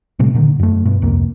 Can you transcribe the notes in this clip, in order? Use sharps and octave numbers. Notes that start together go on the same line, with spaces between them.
A2 C3 G3 A3
A#2 D3 D#3
F#2 A3
G1 G2 B2
C2 F2 A#3